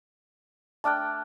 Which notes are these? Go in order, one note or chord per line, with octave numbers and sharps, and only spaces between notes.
A3 D4 G5 A5 F6 F#6